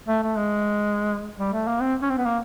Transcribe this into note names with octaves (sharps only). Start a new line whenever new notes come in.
A3
A3
G#3
G3
A3
A#3
C4
C#4
C4
B3
A#3